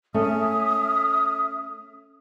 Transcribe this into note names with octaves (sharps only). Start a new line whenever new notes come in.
A3 C#4 E5 D#6 F6